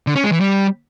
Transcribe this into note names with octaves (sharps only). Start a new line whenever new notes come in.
D3
C#4
G#3
E3
G3